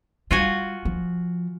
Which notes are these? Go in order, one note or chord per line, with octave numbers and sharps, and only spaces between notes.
G3 F4 F#4 G#5
F3